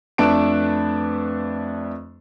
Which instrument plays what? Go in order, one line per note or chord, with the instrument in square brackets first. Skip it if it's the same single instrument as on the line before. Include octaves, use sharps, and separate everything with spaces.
[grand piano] F2 A3 D4 B4 A5 D7